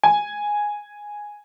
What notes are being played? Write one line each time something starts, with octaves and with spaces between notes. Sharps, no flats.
G#5